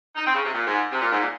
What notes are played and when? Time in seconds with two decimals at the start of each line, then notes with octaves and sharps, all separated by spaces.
0.16 D#4
0.26 C4
0.35 C#3
0.45 C3
0.54 A#2
0.66 G#2
0.91 C3
1.01 A#2
1.11 G#2
1.20 A#2